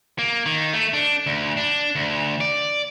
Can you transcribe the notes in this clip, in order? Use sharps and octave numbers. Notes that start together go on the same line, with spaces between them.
A#3
D#3
A3
D4
D2
D4
D2
D5